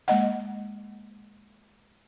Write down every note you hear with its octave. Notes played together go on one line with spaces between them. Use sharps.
G#3 A#3 D#5 F#5